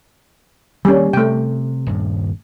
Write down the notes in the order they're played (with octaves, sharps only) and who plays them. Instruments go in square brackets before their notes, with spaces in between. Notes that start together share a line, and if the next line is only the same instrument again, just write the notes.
[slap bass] D#3 A#3 [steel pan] G3 C#4
[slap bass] C3 [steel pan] A3 G5
[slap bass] D#1 G2